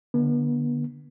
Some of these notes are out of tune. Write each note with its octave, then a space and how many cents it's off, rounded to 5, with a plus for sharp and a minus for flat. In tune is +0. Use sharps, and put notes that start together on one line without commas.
D3 +0 B3 -40